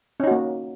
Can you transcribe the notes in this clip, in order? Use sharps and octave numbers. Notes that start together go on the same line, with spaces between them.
A#3 C#4 D#4 F#4